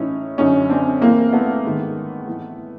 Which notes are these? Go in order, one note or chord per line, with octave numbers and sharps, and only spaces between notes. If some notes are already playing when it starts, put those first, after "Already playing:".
Already playing: A2 E3 C#4 D#4
F#2 D3 C#4 D#4
C4 D4
A2 E3 A#3 C4
A3 B3
G#2 D#3
A2 E3